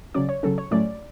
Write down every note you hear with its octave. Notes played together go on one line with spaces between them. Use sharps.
C#3 F#3 C#4 D5
C#5
C#3 F#3 C#4 A4
C#5
A2 F#3 A3 C#4 D5